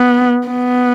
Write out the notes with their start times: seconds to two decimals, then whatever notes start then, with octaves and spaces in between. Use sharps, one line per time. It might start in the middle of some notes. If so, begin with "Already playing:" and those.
Already playing: B3
0.47 B3